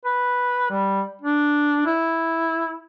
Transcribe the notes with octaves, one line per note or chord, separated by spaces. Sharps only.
B4
G3
D4
E4